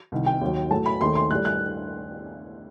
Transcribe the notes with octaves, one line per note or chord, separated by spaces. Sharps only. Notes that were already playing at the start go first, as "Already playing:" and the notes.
C2 C3 D#3
G5
D#2 D#3 F#3
A2 F#3 A3 A5
B5
D#2 D#3 A3 C6
C6
A2 G3 F#6
F#6